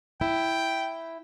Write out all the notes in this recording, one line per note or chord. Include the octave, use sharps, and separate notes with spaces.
E4 G5